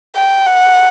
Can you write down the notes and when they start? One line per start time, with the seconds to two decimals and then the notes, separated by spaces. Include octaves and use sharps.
0.16 G5
0.47 F#5